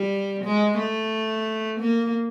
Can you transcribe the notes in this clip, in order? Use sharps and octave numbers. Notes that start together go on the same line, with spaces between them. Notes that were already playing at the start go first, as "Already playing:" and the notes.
Already playing: G3
G#3
A3
A#3